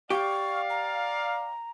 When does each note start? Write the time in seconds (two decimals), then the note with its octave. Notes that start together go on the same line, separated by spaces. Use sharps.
0.10 G4 D5 F5 C#6
0.70 A#5